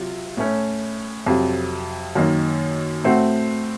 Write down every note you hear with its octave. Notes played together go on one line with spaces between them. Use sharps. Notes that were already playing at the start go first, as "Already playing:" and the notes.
Already playing: C3 F#3 F4
A2 A3 C#4
F2 C3 F#3
F#2 D#3 A#3 D#4
A2 A3 C4 F#4